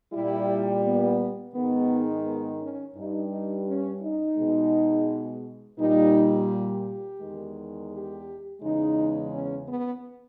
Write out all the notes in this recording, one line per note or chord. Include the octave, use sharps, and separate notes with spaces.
A#2 G3 E4
B3
G#2 D#3 G#3 B3
B3
C#4
G2 G3 D#4
D#4
C#4
D#4
B2 G#3
A#2 G3 D#4
G4
E2 D#3 G#3
G4
E2 C#3 E3 G#3 D#4
C#4
B3